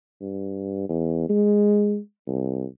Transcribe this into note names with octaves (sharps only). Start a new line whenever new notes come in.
G2
E2
G#3
C2